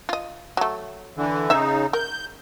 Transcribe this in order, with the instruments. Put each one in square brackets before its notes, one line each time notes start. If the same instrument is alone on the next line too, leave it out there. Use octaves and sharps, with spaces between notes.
[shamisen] F4 D#5
F#3 A3
[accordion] D3 E3
[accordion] C#3 D#4 [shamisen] C#5 E5
[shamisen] A#4 [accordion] G6